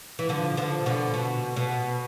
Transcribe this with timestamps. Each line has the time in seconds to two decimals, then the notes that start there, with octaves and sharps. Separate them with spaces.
0.19 E3
0.29 D3 F3
0.57 D3 F3
0.86 B2 D3
1.14 B2
1.56 B2